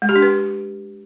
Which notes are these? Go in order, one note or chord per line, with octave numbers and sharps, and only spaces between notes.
G#3
G4
D4
B4